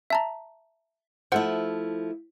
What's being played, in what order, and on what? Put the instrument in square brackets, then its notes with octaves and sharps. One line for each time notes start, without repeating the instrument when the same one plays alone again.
[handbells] E5 A5 A#5
[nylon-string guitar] F3 A3 E4 [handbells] C5 F#5